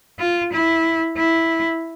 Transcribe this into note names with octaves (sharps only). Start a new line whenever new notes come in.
F4
E4
E4